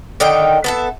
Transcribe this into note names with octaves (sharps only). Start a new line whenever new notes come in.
D3 D#3 D#4 G5
B3 A4 E5